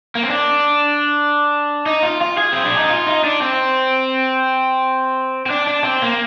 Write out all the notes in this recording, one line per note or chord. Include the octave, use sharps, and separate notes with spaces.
A#3
C4
D4
D#4
F4
F4
G#4
C4
D4
D#4
F4
D#4
D4
C4
C4
D4
D4
C4
A#3